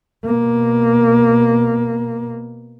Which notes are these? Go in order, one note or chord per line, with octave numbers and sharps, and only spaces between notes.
B2 A#3